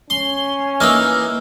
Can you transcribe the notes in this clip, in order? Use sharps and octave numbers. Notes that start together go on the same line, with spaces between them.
C#4 C6
E3 A#3 D#4 E6 F6